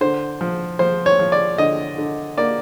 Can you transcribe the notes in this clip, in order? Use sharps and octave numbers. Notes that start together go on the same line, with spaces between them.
D3 C5
F3
F3 C5
C#5
F3
D5
D3 D#5
D3
A#3 D5